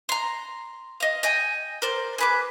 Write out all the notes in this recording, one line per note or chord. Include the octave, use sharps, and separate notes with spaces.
A#5 C6
D#5 F5
D#5 G5 G#5
A#4 C5 D5
G#4 B4 D6